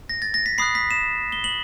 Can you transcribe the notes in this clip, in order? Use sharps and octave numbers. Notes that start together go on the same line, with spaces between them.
A#6
A6
A#6
B6
B5 D#6 F#6 C7
B6
E7
G7
F#7